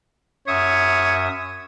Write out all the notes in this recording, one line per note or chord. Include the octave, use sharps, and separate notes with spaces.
F#2 C#5 E5 D#6